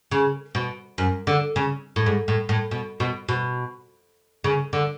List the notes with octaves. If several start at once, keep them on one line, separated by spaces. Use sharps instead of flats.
C#3
B2
F#2
D3
C#3
A2
G#2
A2
A2
B2
B2
B2
C#3
D3